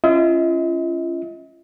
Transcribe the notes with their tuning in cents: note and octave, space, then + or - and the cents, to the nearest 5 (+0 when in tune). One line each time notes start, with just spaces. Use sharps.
C#4 +0 F4 -40 D#5 +40